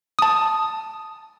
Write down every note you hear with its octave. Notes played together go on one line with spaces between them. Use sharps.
A5 D#6